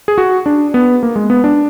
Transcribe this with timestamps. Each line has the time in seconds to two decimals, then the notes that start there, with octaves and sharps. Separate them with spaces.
0.08 G#4
0.18 F#4
0.46 D4
0.74 B3
1.03 A#3
1.16 G#3
1.30 B3
1.44 D4